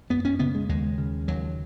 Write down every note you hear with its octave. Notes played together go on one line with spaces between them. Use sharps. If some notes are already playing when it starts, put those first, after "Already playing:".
F#2 B3
C#4
C#3 B3
G#3
D#2 G#3
C#3
D#2 F#3